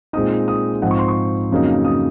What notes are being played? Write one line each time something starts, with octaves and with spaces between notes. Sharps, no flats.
A#2 G#3 C4 D#4 D#6
D#6
G#2 F3 C4 D#4 F#5
C#6
C6
C#6
F2 C#3 F#3 A#3 D#4
D#6